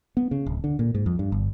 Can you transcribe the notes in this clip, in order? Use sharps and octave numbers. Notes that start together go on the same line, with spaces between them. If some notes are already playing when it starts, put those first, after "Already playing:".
B3
C#3
D1
D3
A#2
G#2
F2
G2
G1